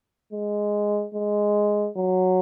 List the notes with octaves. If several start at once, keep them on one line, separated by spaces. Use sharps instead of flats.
G#3
G#3
F#3